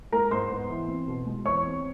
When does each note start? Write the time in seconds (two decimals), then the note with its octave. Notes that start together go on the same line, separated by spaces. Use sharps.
0.12 G#3 A#4 A#5
0.31 G#2 C5 C6
0.51 B3
0.69 E3
0.88 C4
1.08 B2
1.25 G#3
1.45 E2 C#5 C#6
1.64 C4